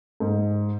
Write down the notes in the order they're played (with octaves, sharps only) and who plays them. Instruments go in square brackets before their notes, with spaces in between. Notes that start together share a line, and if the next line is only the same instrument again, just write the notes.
[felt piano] G#2